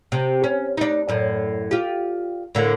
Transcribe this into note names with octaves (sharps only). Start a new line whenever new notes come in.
C3
C#4
D4 D#4
F#2 A2
F4 G4
A2 D3 A#3